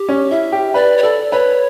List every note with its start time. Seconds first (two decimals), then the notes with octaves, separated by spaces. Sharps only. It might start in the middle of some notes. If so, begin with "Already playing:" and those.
Already playing: G4
0.09 C#4
0.31 E4 E5
0.52 G4
0.74 B4 D5
0.98 C#5
1.03 A4 D5
1.31 B4 C#5